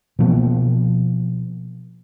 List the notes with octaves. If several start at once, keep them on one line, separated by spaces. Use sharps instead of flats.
B2 F3 A#3